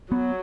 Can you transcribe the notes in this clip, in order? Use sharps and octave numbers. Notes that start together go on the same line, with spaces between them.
F#3 B3